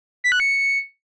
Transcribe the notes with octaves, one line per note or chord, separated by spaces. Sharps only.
B6
F#6
C#7